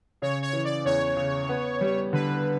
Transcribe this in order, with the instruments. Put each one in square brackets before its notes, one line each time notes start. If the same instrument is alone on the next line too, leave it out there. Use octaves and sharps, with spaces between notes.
[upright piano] C#3 [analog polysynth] C#5
[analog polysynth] C#5
[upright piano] E3
[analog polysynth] D5
[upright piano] E2 [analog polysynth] C#5
[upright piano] C#3
B3
G3
[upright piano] D3 [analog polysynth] B4